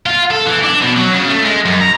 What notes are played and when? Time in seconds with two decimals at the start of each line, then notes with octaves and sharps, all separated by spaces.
0.06 F4
0.30 A4
0.47 E3
0.63 D4
0.81 B2
0.96 F#3
1.14 C#3
1.28 A3
1.45 G#3
1.65 F#2
1.81 A#5